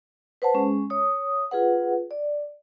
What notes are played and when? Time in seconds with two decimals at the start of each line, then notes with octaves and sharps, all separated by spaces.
0.42 B4 C5 F#5 A5
0.54 G#3 C#4 G#4
0.90 C#5 D#6
1.51 F4 G#4 B4 F#5
2.11 D5